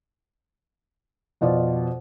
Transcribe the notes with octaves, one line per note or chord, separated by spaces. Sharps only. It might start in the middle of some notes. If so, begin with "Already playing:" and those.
F2 B2 F4 D5